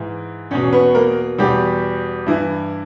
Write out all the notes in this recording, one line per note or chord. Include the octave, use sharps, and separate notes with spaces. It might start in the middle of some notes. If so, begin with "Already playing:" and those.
Already playing: G#2 E3
E2 B2 C#4 C#5
B3 B4
A#3 A#4
E2 B2 G3 G4
G2 E3 E4